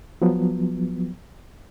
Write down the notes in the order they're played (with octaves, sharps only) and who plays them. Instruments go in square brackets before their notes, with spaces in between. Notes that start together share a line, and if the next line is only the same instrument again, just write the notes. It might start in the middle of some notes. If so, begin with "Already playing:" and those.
[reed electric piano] F3 F#3 B3